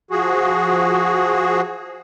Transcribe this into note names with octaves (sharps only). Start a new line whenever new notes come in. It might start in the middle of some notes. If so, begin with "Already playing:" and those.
F3 F#4 G#4